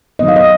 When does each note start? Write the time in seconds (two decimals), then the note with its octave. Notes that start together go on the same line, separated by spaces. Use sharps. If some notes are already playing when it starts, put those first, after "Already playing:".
0.19 D#3 F#3 B3 D#5
0.28 F5
0.36 D#5